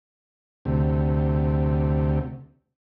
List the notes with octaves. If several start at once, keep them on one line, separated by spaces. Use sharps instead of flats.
D2 C3